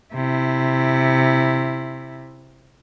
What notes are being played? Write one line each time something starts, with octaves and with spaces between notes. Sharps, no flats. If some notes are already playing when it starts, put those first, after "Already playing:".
C3 E4